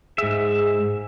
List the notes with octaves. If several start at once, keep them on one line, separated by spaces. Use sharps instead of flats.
G#2 G#4 E5